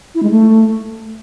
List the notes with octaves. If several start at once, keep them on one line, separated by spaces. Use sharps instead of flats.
E4
G#3
A3